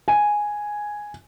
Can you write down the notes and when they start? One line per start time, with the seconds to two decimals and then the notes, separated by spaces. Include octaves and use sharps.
0.08 G#5